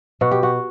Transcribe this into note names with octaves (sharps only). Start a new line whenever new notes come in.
B2 F#4
G4
F#4